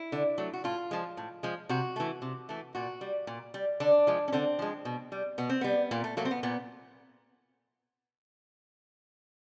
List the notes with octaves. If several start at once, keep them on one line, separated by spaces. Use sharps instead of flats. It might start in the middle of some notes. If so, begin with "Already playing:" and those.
Already playing: E4
D3
F#3 A3
F#4
A2 F4
F3 G#3
A2
F3 G#3
C3 F#4
E3 A3
C3
E3 A3
A#2 F#4
G3
A#2
G3
D3 D4
F3 G#3
C#4
D3 C4
F3 G#3
B2
G3
B2 B3
C4
G3 B3
A#2 A#3
A3
F#3 A3 A#3
C4
B3
A#2 B3